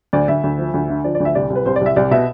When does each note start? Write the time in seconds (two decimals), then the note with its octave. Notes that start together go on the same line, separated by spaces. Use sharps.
0.13 D2 D5
0.28 D2 E5
0.44 D2
0.58 F3
0.74 D2
0.89 D3
1.04 F3 D5
1.15 D5
1.20 D2
1.25 E5
1.35 C2 D5
1.50 C2
1.55 B4
1.66 C2 C5
1.76 D5
1.81 C2 E5
1.96 C2 D5
2.11 B2 E5